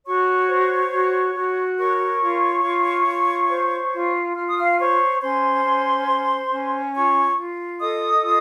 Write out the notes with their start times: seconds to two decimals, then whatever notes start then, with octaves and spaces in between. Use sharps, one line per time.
0.06 F#4 C#5 C#6
0.49 C5
0.92 F#4
1.35 F#4
1.78 A#4 C#5 C#6
2.21 F4
2.65 F4
3.07 F4
3.50 C5
3.93 F4
4.36 F4 F6
4.48 D#6
4.58 F5 F6
4.79 C5 C#5 C#6
5.22 C#4 C5 C6
5.65 C#4
6.08 C5
6.51 C#4
6.93 F4 C#5 C#6
7.37 F4
7.80 A4 D#5 D#6
8.23 F4